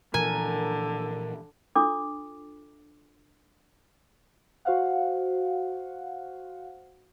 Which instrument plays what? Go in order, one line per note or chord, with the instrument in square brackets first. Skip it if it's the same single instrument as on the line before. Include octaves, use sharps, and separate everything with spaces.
[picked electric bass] A#2 E3 F3 [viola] D3 [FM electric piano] A#4 [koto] G#5
[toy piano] D4 F4 A4 D6
[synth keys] F#4 C5 F5 F#5